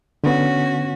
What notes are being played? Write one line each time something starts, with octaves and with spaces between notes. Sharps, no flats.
D3 B3 C#4 F#4